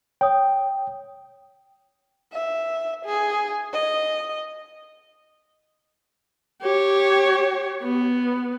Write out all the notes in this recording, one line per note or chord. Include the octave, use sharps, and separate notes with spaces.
C#5 G5 D#6
E5
G#4
D#5
G4 C#5
B3